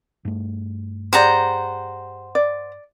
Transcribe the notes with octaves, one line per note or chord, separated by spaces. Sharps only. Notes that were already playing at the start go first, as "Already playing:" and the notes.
G2 A3
G4 G#4 C5 D5 F#5 A#5
D5